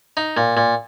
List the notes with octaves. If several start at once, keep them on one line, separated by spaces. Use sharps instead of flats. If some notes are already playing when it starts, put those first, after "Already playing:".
D#4
A#2
A#2